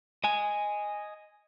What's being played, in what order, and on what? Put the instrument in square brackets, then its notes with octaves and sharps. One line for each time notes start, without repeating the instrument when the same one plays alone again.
[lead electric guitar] D#5 G#5